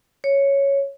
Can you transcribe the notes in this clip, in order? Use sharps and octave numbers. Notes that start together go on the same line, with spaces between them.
C#5